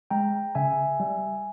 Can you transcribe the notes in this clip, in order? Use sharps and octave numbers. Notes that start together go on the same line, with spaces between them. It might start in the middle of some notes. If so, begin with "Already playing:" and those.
G#3 G5 A#5
C#3 E5 G#5
G3